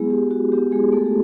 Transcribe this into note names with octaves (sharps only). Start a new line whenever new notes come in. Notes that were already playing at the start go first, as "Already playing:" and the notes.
Already playing: F#3 G#3 B3 E4 G#4
G4
F#4
F#3 B3 E4 G4
G#3 G#4
A3 A4
G4